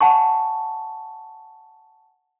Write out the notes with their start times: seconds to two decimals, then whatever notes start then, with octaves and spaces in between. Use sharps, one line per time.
0.01 F#5 G#5 A5 C#6